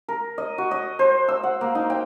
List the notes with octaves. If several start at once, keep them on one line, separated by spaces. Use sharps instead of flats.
A#4
D#5
F#4
D#5
C5
E6
F#5
A#3
D#4
G5